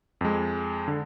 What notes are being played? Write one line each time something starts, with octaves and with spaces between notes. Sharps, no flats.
F2 G#3
D3